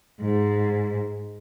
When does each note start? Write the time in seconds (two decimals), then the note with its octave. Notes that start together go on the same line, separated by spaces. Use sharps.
0.21 G#2